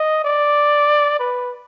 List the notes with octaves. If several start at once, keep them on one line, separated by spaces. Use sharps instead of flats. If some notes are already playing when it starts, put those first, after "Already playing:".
Already playing: D#5
D5
B4